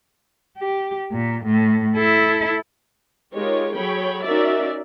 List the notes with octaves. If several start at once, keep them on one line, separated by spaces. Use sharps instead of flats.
G4
A#2
A2
E4 A4
G#3 D#4 F4 G4 A#4 C#5
F#3 G#4 A4 C#5 G5 B5
C#4 D#4 F#4 A#4 D5 E5